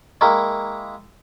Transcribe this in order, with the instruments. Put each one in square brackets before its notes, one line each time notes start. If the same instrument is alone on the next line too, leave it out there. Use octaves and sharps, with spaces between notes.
[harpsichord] G#3 A#3 E4 [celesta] G5 A#5 C#6